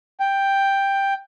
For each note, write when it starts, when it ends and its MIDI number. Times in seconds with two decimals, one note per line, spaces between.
0.20 1.14 79